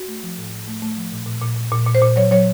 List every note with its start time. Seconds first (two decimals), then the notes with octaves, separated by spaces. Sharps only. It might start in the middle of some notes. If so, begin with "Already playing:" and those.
Already playing: F#4
0.08 A3
0.23 F3
0.38 A2
0.53 A2
0.67 A3
0.82 A3
0.97 F3
1.12 A#2
1.26 A#2
1.42 A#2
1.56 A#2
1.71 A#2
1.86 A#2
1.95 C5
2.01 A#2
2.16 F#3 C#5
2.31 F#3 C#5